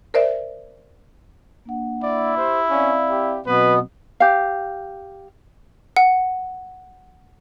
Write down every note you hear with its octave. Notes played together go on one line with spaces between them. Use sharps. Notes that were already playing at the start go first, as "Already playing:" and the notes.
A#4 C5 D5 E5
A#3 D4 F#5
E4 D5
G4 C5
C4 C#4 D5 F5
G4
B2 F#3 B3 C4 B4
G4 F5
F#5